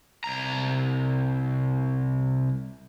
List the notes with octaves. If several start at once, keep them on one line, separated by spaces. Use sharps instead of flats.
C2 A#5